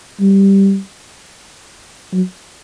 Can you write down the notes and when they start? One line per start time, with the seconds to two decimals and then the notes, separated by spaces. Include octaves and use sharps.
0.21 G3
2.12 F#3